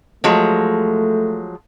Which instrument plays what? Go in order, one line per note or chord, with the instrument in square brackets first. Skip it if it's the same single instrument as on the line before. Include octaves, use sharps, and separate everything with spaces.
[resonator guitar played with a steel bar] F3 F#3 G#3 [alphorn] A3